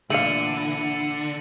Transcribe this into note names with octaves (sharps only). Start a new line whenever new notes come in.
A#2 D3 E3 A3 F5 C#7 D#7 F#7